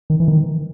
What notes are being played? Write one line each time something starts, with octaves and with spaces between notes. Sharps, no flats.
D#3
E3
D#3